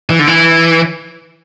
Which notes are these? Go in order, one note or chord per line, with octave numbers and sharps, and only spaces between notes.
E3
D3
E3